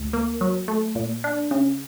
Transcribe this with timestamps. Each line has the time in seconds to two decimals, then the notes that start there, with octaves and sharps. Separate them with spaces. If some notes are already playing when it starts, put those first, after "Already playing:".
Already playing: D2
0.13 A#3
0.41 F#3
0.68 A3
0.95 A#2
1.24 D4
1.51 C#3